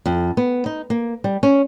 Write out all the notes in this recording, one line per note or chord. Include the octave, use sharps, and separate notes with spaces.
F2
B3
D#4
A#3
G3
C#4